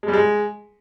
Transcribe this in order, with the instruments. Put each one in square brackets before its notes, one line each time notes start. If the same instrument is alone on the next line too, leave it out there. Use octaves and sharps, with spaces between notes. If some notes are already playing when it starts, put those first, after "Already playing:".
[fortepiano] G#3
G3
G#3